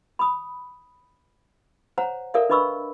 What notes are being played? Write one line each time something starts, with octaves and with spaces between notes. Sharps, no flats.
B5 D#6
C5 C#5 F#5 A#5
A4 A#4 C#5 D5 E5 F5
D4 B4 D#5 B5 C#6 E6